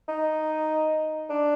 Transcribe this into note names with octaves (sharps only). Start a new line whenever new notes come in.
D#4
D4